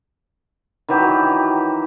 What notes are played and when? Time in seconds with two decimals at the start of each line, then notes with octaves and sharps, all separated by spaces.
0.89 D#3 E3 F#3 G4